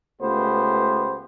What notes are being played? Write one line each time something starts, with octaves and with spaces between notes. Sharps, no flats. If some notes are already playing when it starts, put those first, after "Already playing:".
C#2 A3 B3 G4 C5